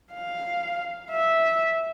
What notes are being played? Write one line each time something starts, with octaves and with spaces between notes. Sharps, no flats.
F5
E5